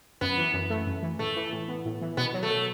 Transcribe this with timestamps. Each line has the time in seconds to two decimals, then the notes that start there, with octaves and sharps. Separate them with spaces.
0.21 F#2 B3
0.38 E3
0.54 F#2
0.70 A3
0.87 F#2
1.03 E3
1.19 A2 A3
1.36 E3
1.53 A2
1.69 B3
1.85 A2
2.02 E3
2.17 B2 B3
2.34 F#3
2.43 A3
2.50 A4